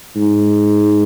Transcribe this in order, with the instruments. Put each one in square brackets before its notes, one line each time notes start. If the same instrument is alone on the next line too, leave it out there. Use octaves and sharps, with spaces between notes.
[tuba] G#2